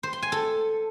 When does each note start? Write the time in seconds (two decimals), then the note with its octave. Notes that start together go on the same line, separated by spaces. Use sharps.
0.03 C5
0.13 C6
0.22 G#5
0.32 A4